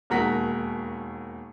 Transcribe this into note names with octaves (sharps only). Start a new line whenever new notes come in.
E1 D#2 A#4 F#5 B6